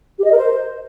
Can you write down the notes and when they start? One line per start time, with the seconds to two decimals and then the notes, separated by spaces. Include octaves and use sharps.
0.18 G4
0.25 D#5
0.31 A#4
0.38 C5